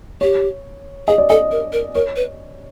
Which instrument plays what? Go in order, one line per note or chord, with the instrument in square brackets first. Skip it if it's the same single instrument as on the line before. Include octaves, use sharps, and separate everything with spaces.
[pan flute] G4 [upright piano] C#5
[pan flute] G#4 [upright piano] D#5
[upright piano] D5
[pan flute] A4 [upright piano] D#5
[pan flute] A#4
A#4
[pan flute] A#4 [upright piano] C#5
[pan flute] B4